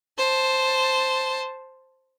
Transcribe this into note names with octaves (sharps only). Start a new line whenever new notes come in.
C5 A5